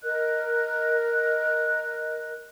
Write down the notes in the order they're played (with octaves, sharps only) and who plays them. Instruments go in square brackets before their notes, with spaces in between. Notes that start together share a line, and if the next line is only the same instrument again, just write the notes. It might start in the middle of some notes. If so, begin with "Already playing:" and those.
[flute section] A#4 D#5 F#6